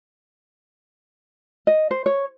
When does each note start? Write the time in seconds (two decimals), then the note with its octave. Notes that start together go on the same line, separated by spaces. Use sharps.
1.67 D#5
1.91 C5
2.06 C#5